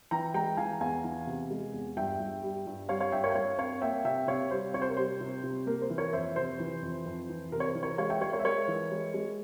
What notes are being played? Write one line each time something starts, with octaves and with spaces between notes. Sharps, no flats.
E3 G5 A#5
G#3 G5 A#5
E3 F5 G#5
E2 F5 G#5
E3
C3
G#3
E2
G2 E5 G5
G2
G3
G2
G3 C#5 F5
C#5 F5
G2 E5 G5
A#4 C#5
G5
G2 C#5 F5
C4 C#5 F5
A#3 E5 G5
C3 E5 G5
C3 C#5 F5
G3 C5
C3 C#5
C5
A#4
G3 C5
C3
C3
A#3 A#4
C5
E3
A#4 C#5
F2 C5 E5
C3 C5
E3
F2
F2
E3
C3 A#4
C#5
C5
E3
A#4 C#5
G#3 C#5 F5
E5 G5
G#3 C#5 F5
A#4 C#5
E5
G#3 A#4 C#5
E3
G#3
G#3